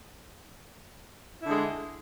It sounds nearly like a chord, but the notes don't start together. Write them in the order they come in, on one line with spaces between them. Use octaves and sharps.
E4 D3 D4 G#3